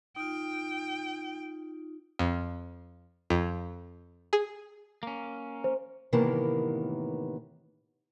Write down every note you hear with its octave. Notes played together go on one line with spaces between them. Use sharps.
D#4 F4 G5
F2
F2
G#4
A#3 C#4
C5
A2 C3 D#3 E3 A#3 B3